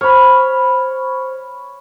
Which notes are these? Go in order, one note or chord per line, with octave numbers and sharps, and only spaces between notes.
C5 C#5 B5 F6